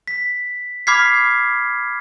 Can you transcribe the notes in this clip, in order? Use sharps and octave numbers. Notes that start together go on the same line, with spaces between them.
B6
B5 D6 F6 G#6 B6 C7